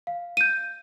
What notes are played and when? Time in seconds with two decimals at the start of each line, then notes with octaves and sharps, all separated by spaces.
0.07 F5
0.37 G6 D#7